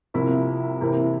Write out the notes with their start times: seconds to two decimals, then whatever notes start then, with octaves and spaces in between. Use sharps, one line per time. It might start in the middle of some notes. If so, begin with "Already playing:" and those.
0.14 C2 C3 F3 A#3 E4
0.81 C3 E3 A#3 E4